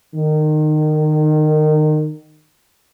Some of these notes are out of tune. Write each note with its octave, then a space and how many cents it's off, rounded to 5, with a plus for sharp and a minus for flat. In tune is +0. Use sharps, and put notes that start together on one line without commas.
D#3 -25